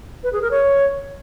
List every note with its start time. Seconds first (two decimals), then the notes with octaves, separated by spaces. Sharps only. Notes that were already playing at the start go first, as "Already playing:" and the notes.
0.24 B4
0.33 G#4
0.42 A#4
0.51 C#5